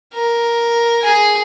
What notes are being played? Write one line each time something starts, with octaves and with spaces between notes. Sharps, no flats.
A#4
G#4 G#5